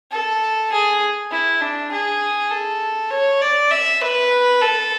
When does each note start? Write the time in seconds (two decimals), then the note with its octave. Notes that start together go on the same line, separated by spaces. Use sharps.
0.11 A4
0.72 G#4
1.31 E4
1.61 D4
1.92 G#4
2.51 A4
3.11 C#5
3.41 D5
3.71 E5
4.01 B4
4.61 A4